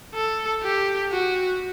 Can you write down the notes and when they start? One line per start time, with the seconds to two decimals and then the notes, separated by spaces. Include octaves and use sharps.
0.14 A4
0.63 G4
1.12 F#4